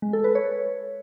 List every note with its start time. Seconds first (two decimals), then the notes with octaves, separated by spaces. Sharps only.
0.02 G#3
0.13 A4
0.24 B4
0.35 C#5